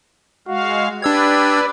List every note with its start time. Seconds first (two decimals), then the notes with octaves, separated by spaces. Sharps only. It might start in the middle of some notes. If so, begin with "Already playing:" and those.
0.48 G#3 F#4 F5
1.02 D4 G4 B4 D5 E6 G#6